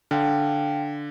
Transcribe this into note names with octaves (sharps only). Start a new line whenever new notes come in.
D3 F5 G5 F6